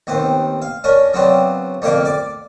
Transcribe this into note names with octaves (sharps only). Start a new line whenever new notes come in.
D#2 B3 C4
F5
C#4 D4 A#4
C#3 F#3 B3 C4 D4
F2 D3 A#3 G4 F5 D6
D5 D6